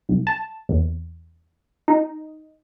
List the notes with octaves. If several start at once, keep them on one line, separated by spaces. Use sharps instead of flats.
C2
A5
E2
D#4